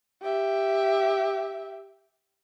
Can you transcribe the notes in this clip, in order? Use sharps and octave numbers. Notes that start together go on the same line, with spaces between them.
G4 E5